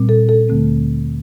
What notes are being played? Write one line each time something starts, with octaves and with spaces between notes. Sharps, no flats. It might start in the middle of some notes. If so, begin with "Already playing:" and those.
Already playing: A#2 G3 C4
A4
A4
D2 D3 A3 C4